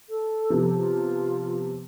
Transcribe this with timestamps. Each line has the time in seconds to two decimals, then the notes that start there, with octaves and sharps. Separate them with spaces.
0.09 A4
0.50 C3 F3 B3
0.77 F4